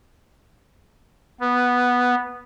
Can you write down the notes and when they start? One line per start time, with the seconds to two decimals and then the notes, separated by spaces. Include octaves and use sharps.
1.41 B3